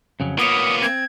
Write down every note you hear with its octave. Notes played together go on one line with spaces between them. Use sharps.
F2 C#3 F#3
A#3 B3 F4 C#5 D#6
C4 G#6